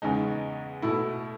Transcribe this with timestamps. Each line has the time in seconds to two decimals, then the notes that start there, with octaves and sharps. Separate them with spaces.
0.02 E2 C#3 G#3 D#4
0.82 B2 A3 E4